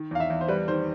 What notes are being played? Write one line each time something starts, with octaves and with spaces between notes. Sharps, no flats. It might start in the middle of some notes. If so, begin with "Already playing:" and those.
Already playing: D#3
E2 F5
E5
E2
C5
G3 B4
D#3 C5